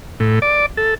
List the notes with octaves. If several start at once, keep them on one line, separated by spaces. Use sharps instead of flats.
A2
D5
A4